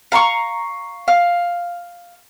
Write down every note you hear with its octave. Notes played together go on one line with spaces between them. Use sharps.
F5 A#5 C6 C#6
F5